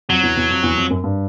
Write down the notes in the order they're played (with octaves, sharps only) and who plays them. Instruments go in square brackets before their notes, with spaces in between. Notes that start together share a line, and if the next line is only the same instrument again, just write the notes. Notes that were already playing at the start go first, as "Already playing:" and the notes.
[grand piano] F2 [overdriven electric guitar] F#3
[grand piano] E2
E2
F2
E2
F2
F#2
G2